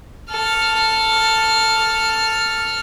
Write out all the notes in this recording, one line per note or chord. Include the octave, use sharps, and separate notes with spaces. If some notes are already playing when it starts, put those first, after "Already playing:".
A4 F6